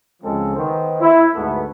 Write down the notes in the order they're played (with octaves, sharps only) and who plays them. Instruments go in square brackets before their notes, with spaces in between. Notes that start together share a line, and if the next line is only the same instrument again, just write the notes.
[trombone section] C#2 C#3 F3 G#3 C4 A4
D#3 B3 C5
E4
D2 G#2 A3 B3